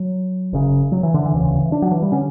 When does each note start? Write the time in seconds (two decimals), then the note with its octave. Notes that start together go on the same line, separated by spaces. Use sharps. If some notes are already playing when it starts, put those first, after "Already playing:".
Already playing: F#3
0.53 F#1 F#2 C#3
0.92 F#3
1.03 E3
1.14 D3
1.26 E3
1.32 E1 D2 C#3
1.72 D4
1.82 F#3
1.91 E3
2.02 G3
2.12 D3 C#4